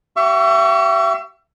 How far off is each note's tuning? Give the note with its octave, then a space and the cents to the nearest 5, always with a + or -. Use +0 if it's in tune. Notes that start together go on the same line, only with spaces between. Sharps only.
G4 -40 E5 +35 C#6 +20